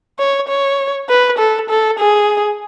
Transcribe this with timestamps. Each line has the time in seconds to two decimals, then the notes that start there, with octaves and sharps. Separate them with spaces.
0.19 C#5
0.48 C#5
1.09 B4
1.38 A4
1.70 A4
1.99 G#4